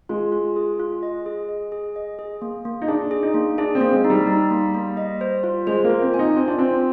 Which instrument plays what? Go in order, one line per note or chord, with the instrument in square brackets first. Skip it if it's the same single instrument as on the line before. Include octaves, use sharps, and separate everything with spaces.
[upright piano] G#3 [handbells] F4
[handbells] F4
G#4
F4
D#5
G#4
D#5
G#4
D#5
G#4
A#3
A#3
[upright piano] D#4
[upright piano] D4 [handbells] G#4
[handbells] G#4
[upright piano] D#4
[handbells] A#3
[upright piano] D4 [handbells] G#4
[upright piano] C4
[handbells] A#3
[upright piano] G#3
[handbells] D#4
[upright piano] G3
[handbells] D#4
A#3
A#3
D#5
C5
F4
[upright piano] G#3 [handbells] C5
[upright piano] A#3
[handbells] F4
[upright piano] C4
[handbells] G#5
[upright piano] D#4
[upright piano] C4 [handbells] F4
[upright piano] D4
[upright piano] C4 [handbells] F4